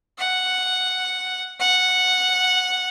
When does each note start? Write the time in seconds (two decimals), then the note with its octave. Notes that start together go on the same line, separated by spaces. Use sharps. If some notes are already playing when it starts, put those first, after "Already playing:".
0.19 F#5
1.60 F#5